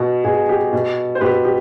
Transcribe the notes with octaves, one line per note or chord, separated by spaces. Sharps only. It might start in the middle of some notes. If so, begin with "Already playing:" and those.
Already playing: B2
B2 G#4
G4
B2
C5
B2 G4 B4
G4